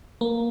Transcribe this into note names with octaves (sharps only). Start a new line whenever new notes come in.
A#3